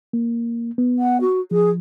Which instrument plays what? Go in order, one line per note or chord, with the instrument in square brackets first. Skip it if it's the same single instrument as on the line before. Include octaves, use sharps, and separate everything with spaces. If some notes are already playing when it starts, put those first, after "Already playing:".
[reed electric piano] A#3
B3
[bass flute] F#5
F#4
[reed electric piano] F3 [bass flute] G#4